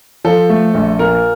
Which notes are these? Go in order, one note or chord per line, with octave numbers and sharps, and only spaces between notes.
F3 A4
A3
A#1
A#2 A#4